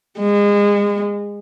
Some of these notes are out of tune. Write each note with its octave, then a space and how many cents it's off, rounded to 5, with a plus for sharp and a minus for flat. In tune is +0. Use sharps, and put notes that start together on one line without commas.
G#3 -30